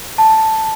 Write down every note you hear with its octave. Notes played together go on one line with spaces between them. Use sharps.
A5